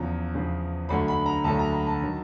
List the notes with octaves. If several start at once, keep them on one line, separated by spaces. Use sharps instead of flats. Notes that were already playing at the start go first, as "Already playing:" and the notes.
Already playing: E2 C#3 F3 A#5
E2 C#3 F3
D2 D3 F#3 B5
B5
A#5
D2 D3 F#3 A5
A#5
B5
A5
D#3 F#3